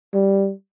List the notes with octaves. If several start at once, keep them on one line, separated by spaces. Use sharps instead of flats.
G3